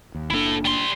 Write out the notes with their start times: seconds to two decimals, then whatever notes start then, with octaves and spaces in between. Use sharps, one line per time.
0.15 D#2
0.30 F#1 A#3 D4 E4 A4
0.65 G3 C6